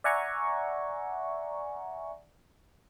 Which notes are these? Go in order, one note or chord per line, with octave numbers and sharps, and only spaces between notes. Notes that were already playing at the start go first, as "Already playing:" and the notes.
D5 E5 F#5 G#5 A#5 C#6